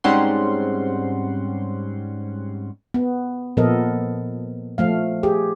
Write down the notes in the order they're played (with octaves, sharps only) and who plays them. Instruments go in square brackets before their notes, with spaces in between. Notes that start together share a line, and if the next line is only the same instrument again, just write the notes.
[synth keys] G#2 G3 C4 C#4 F#5 C6
[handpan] B3
A#2 F3 B3 A4 A#4 D#5
F3 A3 F5
G4 G#4